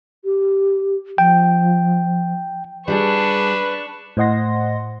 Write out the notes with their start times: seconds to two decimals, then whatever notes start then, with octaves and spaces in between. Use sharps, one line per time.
0.25 G4
1.18 F3 G5
2.88 G3 D4 G4 G#4 B4 C#6
4.17 A2 C5 D#5 F#5 C6 A#6